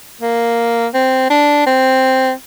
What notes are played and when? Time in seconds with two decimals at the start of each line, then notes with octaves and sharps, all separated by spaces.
0.21 A#3
0.94 C4
1.30 D4
1.66 C4